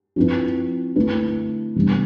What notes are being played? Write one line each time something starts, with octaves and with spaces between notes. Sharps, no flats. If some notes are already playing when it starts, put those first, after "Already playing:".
F3 C4 E4 B4
D3 A3 E4 B4
C3 E3 G3 B3 D4